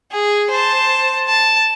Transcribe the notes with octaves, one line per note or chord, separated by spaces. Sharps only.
G#4
C5 A5
A5